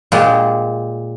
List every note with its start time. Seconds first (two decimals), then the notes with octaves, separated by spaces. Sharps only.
0.12 A#2 G#3 G4